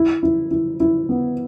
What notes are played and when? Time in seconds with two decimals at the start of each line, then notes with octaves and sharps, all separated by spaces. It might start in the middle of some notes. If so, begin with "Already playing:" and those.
Already playing: E4
0.23 E4
0.51 E4
0.80 E4
1.09 B3